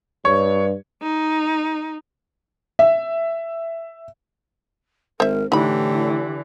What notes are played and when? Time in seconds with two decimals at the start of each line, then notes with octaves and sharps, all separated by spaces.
0.25 G2 C#5
1.02 D#4
2.79 E5
5.20 G#1 A#4 C5 E5
5.52 A2 D3 E3 D#4 G4 B5